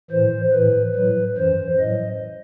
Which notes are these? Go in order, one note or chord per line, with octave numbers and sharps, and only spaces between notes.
A2 E3 C5
A2 E3 B4
A2 F#3 B4
F#2 E3 C5
A2 D#5
F#3